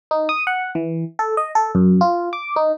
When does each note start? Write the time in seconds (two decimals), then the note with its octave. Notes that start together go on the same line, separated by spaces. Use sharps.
0.11 D#4
0.29 D#6
0.47 F#5
0.75 E3
1.19 A4
1.37 D#5
1.55 A4
1.75 F#2
2.01 F4
2.33 D6
2.56 D#4